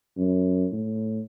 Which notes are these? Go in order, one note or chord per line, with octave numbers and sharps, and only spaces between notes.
F#2
A2